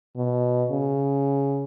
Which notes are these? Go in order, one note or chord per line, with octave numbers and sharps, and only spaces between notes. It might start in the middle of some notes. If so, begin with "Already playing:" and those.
B2
C#3